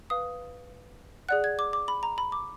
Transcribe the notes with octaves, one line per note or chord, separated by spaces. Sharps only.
B4 F5 D#6
G#4 D5 F#5 F#6
G#6
D6
D6
B5
A#5
B5
D6